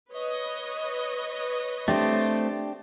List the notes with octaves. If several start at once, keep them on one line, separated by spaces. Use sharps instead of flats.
B4 C#5 D#5
A3 C4 D4 G4